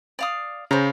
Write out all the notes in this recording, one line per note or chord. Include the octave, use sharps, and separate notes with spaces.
D5 F5 D#6
C#3 C5 A#5